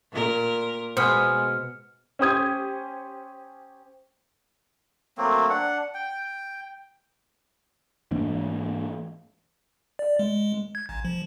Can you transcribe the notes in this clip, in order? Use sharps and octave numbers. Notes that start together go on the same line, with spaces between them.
A#2 A#4
B2 G#3 B3 C5 F#5 G#5 F6 C#7
C#4 G4 C5 D#6 G#6
F#3 A3 A#3 C4
D4 F#5
G5
G#2 E3 A#3 D4
D5
G#3
G#6
A1
F3